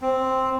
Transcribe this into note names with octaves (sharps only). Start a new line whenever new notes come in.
C4